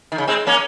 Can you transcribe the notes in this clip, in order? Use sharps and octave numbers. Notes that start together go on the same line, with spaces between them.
D#3
C#3
G#3 C4
A#3 C#4